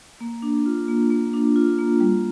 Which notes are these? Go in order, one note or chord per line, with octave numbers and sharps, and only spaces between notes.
A#3
D4
F4
A#3
A#3
D4
F4
A#3
G3